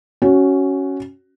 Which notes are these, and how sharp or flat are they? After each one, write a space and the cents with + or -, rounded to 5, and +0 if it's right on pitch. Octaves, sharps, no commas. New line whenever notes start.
C#4 +0 F#4 +15